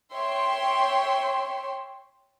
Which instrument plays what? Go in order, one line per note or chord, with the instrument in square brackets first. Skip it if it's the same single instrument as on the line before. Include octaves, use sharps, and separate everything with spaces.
[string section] C#5 E5 G5 C6